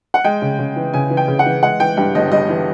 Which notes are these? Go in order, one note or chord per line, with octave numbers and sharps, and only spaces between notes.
F#5
G#3 G5
C#3
C#3
E3
C#3 G#5
E3
G5
C#3
F#5
E3
G#3 F#5
E3 G5
G2 G5
G1 D#5
G2 D#5
E3